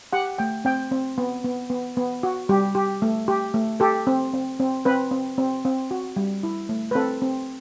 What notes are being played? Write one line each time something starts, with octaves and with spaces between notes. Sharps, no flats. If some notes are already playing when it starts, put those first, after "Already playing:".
G4 F#5
A3 G5
C4 G5
C4
B3
B3
B3
B3
F#4
G3 G4
G4
A3
G4
A3
G4 A4
C4
C4
C4
C4 B4
C4
C4
C4
F#4
G3
E4
A3
B4
C4 A4
C4